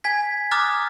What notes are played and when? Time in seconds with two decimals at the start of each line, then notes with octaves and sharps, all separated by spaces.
0.04 G#5 G#6 B6
0.51 A#5 D6 D#6 F6 F#6 A6